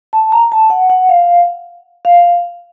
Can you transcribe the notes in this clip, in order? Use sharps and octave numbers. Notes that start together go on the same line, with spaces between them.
A5
A#5
A5
F#5
F#5
F5
F5